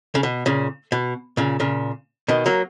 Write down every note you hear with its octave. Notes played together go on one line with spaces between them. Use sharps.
C#3
B2
A#2 C#3
B2
A#2 C#3
A#2 C#3
B2 D#3
F#3 A#3